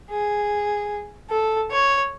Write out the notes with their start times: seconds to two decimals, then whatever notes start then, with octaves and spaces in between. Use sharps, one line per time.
0.11 G#4
1.30 A4
1.71 C#5